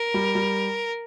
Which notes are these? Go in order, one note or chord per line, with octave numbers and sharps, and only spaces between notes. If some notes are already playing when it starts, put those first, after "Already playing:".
Already playing: A#4
G3
G3